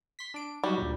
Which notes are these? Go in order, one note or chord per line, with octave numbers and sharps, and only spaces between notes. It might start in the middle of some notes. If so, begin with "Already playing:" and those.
C6 B6
D4 D7
F#3 G3 D#4 F#4
D2 A#2